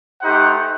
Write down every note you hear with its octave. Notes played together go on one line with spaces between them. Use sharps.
A3 D#4 G4 C5 F#5